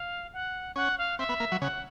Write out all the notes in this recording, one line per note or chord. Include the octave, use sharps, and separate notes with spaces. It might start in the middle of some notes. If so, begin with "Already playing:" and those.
Already playing: F5
F#5
C#4 F#5
F5
C4 E5
B3
A#3
F#3
C#3 F#5